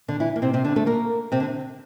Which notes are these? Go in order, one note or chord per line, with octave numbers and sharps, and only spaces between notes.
D3 D4
E3 E4
A#3
C3 C4
C3 C4
D3 D4
A3 A4
A#3 A#4
C3 C4
D3